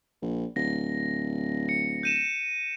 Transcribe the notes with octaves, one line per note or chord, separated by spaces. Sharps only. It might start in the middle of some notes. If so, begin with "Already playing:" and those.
A#1
D1 A#6
C#7
G6 D#7 E7